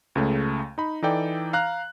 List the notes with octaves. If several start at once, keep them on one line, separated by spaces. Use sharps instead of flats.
C#2 C#3 A3
D#4 B5
E3 D#4 A4 D5 G5
F5 A#5 F#6